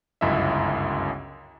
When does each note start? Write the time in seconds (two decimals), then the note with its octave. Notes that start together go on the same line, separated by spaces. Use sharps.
0.21 G1 C#2 F#2 E4 D#5 E5